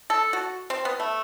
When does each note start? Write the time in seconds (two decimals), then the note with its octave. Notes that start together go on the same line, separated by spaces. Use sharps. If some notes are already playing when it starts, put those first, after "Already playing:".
0.10 A4
0.33 F#4
0.70 C4
0.85 B3
1.00 A3